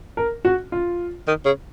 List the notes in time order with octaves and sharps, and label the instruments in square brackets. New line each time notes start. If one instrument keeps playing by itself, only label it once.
[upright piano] A#4
F#4
F4
[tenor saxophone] D#3
C#3